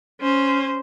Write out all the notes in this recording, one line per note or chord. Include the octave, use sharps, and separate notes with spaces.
C#4 C5